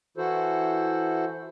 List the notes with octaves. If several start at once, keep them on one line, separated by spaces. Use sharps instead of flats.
E3 E4 F#4 A4 C5